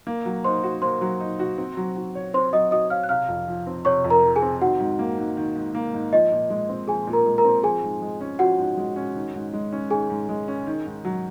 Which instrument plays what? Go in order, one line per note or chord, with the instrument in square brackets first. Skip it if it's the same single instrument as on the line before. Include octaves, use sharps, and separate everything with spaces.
[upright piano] A#3
F#3
[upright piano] D#4 [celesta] C5 C6
[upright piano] F#4
[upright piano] A#3 [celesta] C5 C6
[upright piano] F#3
D#4
F#4
C4
F#3
F#4
C#5
[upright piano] C4 [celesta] C5 C6
[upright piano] F#3 [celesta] D#5 D#6
[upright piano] F#4 [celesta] D#5 D#6
[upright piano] C#5 [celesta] F5 F6
[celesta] F#6
[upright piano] C3 [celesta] F5 F6
[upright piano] F2
F3
C4
[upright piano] C3 [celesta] C#5 C#6
[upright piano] F2
[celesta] A#4 A#5
[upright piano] F3
[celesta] G#4 G#5
[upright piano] C4
[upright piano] D#3 [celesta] F#4 F#5
[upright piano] G#2
A#3
G#2
D#3
G#2
A#3
G#2
[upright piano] F3 [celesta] D#5
[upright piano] A#2
G#3
C4
[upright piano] F3 [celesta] G#4 G#5
[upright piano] A#2
[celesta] A#4 A#5
[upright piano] G#3
[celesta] A#4 A#5
[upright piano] C4
[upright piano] F3 [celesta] G#4 G#5
[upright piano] G#2
G#3
C#4
[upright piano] F3 [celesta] F#4 F#5
[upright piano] G#2
G#3
C#4
D#3
G#2
G#3
C#4
[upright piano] D#3 [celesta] G#4 G#5
[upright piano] G#2
G#3
C#4
D#3
G#2
F#3